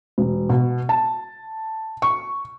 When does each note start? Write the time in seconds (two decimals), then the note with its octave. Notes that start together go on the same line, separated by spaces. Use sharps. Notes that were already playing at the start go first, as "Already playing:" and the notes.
0.18 E1
0.49 B2
0.89 A5
2.02 C#6